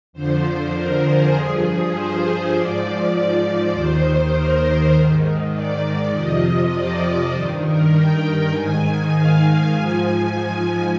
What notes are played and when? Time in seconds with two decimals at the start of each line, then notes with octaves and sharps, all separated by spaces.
0.13 F2 D3 F3 C5
0.74 A#4
1.03 G#4
1.33 G2 F3 G#4
1.92 C5
2.53 G#2 F3 D5
3.72 D#2 D#3 C5
4.32 A#4
4.93 G#2 D#3
5.53 D5
6.12 F2 C3 F3 D#5
6.72 D5
7.32 G2 D#3 C5
7.63 A#4
7.93 G5
8.52 G#2 D#3 G#5
9.12 F5
9.73 G#2 F3 G#5